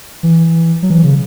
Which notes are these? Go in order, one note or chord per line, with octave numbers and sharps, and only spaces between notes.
E3
F#3
E3
C#3